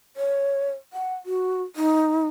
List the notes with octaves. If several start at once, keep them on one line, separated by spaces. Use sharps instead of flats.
C#5
F#5
F#4
D#4